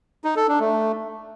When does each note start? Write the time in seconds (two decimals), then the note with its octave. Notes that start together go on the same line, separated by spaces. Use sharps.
0.24 D#4
0.36 A4
0.48 D4
0.60 A3